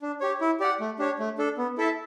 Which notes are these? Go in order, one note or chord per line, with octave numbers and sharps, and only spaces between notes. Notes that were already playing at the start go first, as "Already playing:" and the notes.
D4
G4 C#5
E4
G4 D5 F#5
A3
D4 G4 C#5
A3
D4 A4
B3
E4 A4 E5 A5